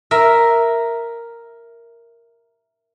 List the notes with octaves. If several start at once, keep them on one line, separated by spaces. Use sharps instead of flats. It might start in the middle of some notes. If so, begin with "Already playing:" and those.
A#4 E5